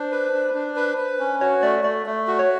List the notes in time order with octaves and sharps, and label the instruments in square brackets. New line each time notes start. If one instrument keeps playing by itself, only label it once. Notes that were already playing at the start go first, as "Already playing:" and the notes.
Already playing: [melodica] D4 [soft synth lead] C5
[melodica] B4
D4
D4
B4
B4
C#4
[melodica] F#4 [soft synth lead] C#5
[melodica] A3 [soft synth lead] D5
[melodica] A3 [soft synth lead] D5
[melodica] A3
F#4
[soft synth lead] C#5